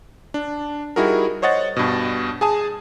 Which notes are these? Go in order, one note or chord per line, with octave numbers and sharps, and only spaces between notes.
D4
G3 D#4 E4 F#4 G#4 A#4
C5 C#5 D#5 F#5 A6
G2 B2
G#4 G#5 A5 D#6